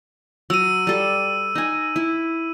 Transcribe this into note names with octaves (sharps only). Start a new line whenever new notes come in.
F#3 E6 D#7
G3 A4
D#4 G#5
E4